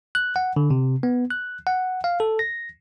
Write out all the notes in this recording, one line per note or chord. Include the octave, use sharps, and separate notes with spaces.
F#6
F#5
D3
C3
B3
F#6
F#5
F5
A4
A#6